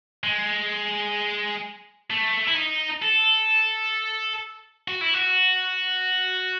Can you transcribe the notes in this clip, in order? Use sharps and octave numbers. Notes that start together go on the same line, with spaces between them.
G#3
A3
E4
D#4
A4
F#4
E4
F#4